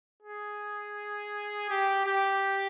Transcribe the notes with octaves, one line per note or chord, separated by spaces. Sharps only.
G#4
G4
G4